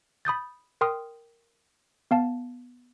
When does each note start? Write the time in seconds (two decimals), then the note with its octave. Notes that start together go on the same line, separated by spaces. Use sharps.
0.25 B5 D#6 G6 A6
0.81 A#4 G5 C6 D#6 F6
2.11 B3 F5 A5